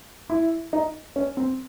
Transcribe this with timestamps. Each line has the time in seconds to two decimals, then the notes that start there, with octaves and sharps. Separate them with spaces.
0.30 E4
0.73 D#4
1.16 C#4
1.37 C4